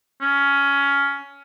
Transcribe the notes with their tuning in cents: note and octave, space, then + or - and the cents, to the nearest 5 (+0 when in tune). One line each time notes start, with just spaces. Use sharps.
C#4 +15